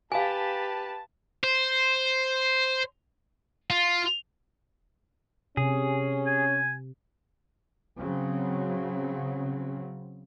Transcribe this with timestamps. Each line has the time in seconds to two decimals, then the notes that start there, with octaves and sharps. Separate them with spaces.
0.12 G4 B4 F5 G#5 A5
1.44 C5
3.70 F4
5.57 C3 C#4 G#4
6.26 G#5
7.98 C#3 F#3 C4